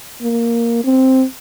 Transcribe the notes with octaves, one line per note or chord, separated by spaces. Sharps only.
A#3
C4